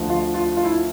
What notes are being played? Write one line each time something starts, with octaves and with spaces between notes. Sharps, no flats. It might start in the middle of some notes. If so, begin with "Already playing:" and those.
Already playing: D2 D3 F3
F4
F4
F4
E4